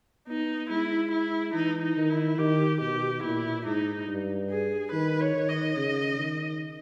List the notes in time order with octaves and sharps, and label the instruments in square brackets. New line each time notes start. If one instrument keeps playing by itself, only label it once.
[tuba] B3 [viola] D#4
[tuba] G#3 [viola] E4
[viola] E4
[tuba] E3 [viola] D#4
[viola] D#4
[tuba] D#3
[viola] E4
[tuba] D#3 [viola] G4
[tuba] B2 [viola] G4
[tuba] A#2 [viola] E4
[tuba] G#2 [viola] D#4
[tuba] G2
[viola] G#4
[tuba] D#3 [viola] B4
[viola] C#5
[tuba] D#3
[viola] D#5
[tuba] C#3
D#3